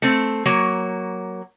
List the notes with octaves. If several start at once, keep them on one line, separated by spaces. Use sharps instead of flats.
A3 C4
F#3 A#3 C#5